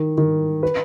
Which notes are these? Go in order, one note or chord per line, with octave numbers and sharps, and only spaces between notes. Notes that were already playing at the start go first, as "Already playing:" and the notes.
Already playing: D#3
D#3
B4